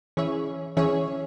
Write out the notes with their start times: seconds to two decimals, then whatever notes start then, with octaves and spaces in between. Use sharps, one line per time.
0.17 E3 C#4 G#4 C#5 E5
0.77 E3 C#4 G#4 C#5 E5